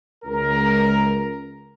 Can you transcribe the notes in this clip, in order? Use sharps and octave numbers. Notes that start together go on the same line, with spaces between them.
C#2 A#4